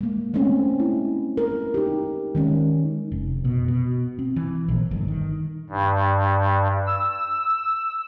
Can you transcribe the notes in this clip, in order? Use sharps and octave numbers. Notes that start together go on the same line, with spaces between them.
G#3 A#3
G#3 A3 C4 C#4
E4
A#4
D#4 G4
D#3 G#3 C#4
F1
B2
B2
C4
E3
A#1
G1
D#3
G2
E6